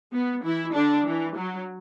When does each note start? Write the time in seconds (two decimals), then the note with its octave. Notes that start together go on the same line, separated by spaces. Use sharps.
0.13 B3
0.44 E3 E4
0.75 D3 D4
1.05 E3
1.36 F#3